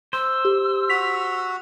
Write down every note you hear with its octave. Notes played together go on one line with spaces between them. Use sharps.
C5 E6
G4
F#4 B6 F7